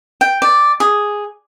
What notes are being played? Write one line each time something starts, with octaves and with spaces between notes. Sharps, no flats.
G5
D5
G#4